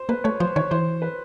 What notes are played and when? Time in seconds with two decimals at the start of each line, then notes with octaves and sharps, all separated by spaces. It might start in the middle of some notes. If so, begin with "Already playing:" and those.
Already playing: C5
0.09 A#3 B4
0.24 A3 C#5
0.40 F3 C5
0.56 D#3 C#5
0.71 E3 C5
1.02 B4